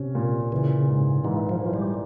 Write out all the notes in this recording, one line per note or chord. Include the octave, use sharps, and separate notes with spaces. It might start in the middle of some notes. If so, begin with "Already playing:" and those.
Already playing: C3 C#4
A#2
C#3 E3
G#2
G#2 E3
F3
E3
G3